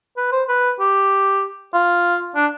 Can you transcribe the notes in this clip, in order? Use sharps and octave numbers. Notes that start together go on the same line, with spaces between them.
B4
C5
B4
G4
F4
D4